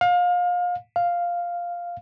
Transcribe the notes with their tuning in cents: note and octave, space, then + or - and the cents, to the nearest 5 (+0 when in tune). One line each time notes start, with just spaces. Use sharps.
F5 +30
F5 +0